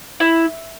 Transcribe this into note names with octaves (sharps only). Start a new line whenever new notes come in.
E4